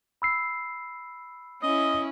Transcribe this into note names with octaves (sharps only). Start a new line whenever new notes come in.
B5 E6 C7
C#4 E4 D#5